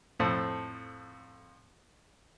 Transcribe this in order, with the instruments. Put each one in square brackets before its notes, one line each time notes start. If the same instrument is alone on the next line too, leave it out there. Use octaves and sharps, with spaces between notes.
[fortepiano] F2 A2 A4 C5 A5